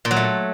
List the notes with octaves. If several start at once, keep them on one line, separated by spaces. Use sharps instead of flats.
A#2
F#3
A3